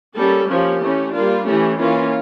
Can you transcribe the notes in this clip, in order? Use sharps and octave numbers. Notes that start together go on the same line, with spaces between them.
G3 A#3 C#4 A4
F3 A#3 C#4 G4
E3 A3 C#4
G3 A#3 D4 F4
E3 A3 C#4 G4
E3 A#3 C#4 F4